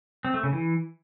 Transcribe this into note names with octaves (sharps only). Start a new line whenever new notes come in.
C4
A3
C#3
E3